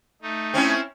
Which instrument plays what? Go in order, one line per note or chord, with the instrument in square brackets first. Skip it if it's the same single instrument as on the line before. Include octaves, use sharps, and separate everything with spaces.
[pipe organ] A3 D#4
[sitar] C4 C#4 E4